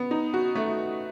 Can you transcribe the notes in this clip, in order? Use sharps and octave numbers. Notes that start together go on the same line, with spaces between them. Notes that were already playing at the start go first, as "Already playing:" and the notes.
Already playing: B3
D#4
F#4
A3